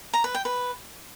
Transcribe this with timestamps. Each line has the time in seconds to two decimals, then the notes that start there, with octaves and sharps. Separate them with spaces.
0.13 A#5
0.24 B4
0.35 G5
0.45 B4